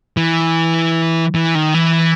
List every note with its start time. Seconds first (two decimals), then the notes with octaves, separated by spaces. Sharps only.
0.17 E3
1.35 E3
1.55 D#3
1.74 E3